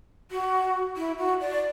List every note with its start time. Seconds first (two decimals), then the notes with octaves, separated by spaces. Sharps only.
0.31 F#4
0.97 E4
1.18 F#4
1.41 D5